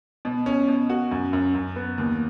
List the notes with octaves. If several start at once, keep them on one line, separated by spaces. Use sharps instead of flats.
B2
C#4
B2
F#4
F#2
F#2
F#2
B3
D#2